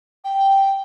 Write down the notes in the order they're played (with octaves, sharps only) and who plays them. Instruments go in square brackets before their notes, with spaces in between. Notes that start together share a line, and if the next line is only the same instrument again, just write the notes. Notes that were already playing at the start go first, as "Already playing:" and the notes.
[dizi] G5